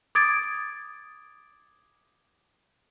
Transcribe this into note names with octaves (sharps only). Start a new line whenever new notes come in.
D6 D#6 G#6 A6 D7